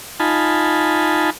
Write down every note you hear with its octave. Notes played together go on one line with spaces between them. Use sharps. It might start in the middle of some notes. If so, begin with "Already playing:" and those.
D#4 F4 G#5 A5 B5